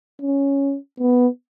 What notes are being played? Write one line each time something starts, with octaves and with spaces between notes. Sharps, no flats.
C#4
B3